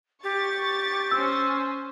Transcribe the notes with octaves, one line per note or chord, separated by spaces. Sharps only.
G4 C#6 A6
C#4 C5 E6